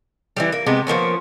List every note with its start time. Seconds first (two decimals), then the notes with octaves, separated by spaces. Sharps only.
0.36 E3 F#3 G3
0.52 A#3
0.66 C3 G#3 B3 G4
0.87 F3 A#3 B3 C#4